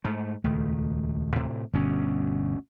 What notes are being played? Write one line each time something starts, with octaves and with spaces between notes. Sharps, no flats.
G#2 A3
D#1 C#2 D#3 A3
A2 C3
G1 D2 B2 C#4